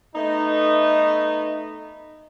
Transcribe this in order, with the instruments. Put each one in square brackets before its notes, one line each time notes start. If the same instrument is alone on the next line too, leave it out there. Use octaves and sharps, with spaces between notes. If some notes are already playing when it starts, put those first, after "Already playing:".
[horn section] A3 B3 D#4